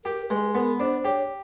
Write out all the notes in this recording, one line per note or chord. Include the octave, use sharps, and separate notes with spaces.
G4 A#4
G#3 B4
B3 A#4
D4 C5
G4 C#5